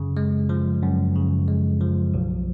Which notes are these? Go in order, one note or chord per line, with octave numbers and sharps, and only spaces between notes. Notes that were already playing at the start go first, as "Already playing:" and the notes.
Already playing: F#2 C#3
G#3
F3
F#2
C#3
G#3
F3
B1